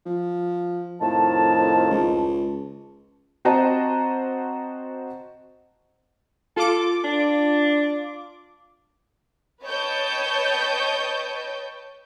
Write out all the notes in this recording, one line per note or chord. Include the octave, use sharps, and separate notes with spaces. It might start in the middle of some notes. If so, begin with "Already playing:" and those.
F3
F2 A2 D#3 A5
C#2
C4 F#4 C5 D#5 A5 A#5
F4 A4 D6
D4
B4 C#5 D#5 G5 A5 G6